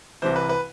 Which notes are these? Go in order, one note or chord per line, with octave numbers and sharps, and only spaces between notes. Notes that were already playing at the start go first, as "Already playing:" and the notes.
C2 C3 E3 C5
B4
B4